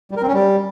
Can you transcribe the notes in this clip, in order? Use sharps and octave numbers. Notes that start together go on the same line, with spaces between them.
G3
A#4
C4
C#4
G3